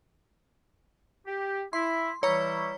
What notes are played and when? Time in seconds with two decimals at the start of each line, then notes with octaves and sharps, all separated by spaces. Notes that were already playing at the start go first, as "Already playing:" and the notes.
1.27 G4
1.73 E4 C6
2.23 E3 G3 E4 C#5 A#5 C#6